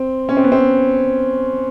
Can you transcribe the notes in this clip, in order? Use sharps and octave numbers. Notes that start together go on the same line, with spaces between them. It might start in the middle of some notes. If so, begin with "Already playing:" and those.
Already playing: C4
C#4
C4
B3
C4